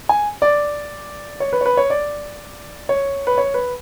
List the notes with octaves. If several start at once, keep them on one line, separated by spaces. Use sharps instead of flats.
G#5
D5
C#5
B4
C#5
B4
C#5
D5
C#5
B4
C#5
B4